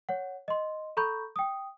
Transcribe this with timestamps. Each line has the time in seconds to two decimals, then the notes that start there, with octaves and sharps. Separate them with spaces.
0.09 C#5 F#5
0.48 D#5 C6
0.97 A4 A#5 B5 C#6 G6
1.36 G5 D#6